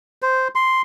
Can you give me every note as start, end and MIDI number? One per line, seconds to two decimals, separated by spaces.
0.22 0.48 72
0.55 0.82 84